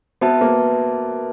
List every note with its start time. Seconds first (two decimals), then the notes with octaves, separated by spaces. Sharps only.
0.21 B3 F#4 B4 E5 A5
0.41 A#3